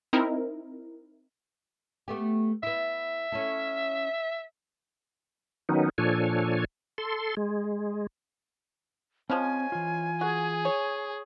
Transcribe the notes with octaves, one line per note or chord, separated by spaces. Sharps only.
C4 D#4 E4 A#4
A3 B3 G4
B3 E4 E5
C#4 E4 A4
D#3 F#3 B3 C#4 D#4
A#2 F3 D4 A4 C#5 G#5
A4 C6
G#3
F3 G#3 C4 C#4 C5 G#5
E3 F4
F#4 G#4
C#5